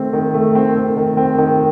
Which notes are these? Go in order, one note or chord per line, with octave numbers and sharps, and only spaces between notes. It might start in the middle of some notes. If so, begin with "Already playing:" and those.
Already playing: D#3 A3 C4
D#3
A3
C4
C4
D#3
C4
D#3